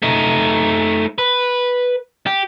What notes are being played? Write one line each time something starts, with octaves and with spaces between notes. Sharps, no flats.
A3 D#4
B4
G4